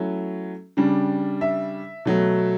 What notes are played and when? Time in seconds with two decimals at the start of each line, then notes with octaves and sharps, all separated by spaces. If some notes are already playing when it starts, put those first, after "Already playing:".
Already playing: F#3 A3 C#4 E4
0.77 C#3 G3 D4
1.41 E5
2.05 B2 F#3 A3